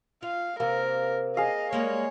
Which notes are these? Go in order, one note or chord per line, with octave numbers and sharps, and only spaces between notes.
F4 F5
C3 A#3 A#4
G#4 D#5 F5
G3 G#3 A#3 C#5